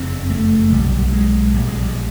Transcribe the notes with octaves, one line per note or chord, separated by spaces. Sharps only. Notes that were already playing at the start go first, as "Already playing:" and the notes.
Already playing: F#1 F2 C#3 C4
A3
B1 A#2 G3
G#3
A#1 A#2 G3
G#3
G3